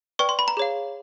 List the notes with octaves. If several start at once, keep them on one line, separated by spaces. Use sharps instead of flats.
B4 D5 G5 C#6
C6
B5
A#5
G#4 C#5 F5